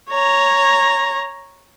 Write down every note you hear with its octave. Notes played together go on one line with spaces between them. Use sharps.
C#5 A#5